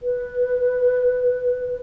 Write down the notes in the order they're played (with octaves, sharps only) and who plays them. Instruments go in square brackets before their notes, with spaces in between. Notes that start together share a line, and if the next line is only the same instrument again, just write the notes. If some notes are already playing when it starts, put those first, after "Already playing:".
[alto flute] B4